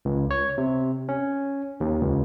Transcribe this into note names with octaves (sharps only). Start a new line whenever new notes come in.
C#2
C#5
C3
C#4
D#2
C#2